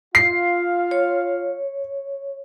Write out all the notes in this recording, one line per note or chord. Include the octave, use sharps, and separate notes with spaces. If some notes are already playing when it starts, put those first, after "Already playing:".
F4 F5 C7
C#5